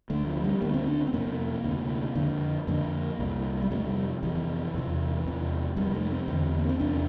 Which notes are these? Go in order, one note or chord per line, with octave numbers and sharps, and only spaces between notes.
D2 D3 A3
F3
G3
D2 D3 A#3
C4
D4
C4
F2 C3 A#3
D2 C3
F2 D3
F2 D3 A#3
C2 C3
G3
F2 C3 A3
G3
F2 C3 E3
E2 C3
E2 C3
F2 C3 G3
A3
C4
E2 D3
A#3
C4
E2 C3 D4